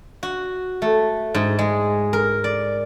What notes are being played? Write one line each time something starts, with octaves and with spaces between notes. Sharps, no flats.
F#4
A3
G#2
G#3
A#4
D5